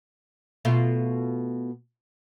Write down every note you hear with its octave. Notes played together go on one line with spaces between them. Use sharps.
B2 A3 F4